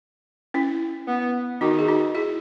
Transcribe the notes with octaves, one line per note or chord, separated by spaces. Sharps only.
C#4 E4
B3
D#3 D#4 F#4
G#4
D#4 F#4
E4 G#4